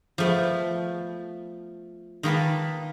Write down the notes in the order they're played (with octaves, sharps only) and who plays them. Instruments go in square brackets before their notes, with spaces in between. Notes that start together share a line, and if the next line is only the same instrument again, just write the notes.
[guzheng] F3 A3 B3
D#3 A#3 B4 A5